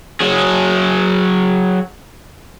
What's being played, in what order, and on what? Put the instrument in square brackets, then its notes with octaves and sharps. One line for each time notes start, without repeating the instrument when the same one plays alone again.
[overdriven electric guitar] F#3 G#4